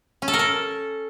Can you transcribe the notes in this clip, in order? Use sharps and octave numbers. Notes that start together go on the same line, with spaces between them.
C#4
A4
A#4
A4